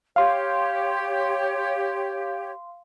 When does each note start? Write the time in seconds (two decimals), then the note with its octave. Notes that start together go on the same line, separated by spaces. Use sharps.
0.16 G4 C#5 F5 C6